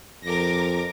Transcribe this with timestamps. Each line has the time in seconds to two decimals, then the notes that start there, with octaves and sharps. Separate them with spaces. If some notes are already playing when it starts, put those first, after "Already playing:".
0.24 F2 A#4 D6 A#6